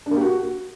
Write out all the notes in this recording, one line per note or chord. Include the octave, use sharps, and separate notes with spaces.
D4
A#3
G4
F#4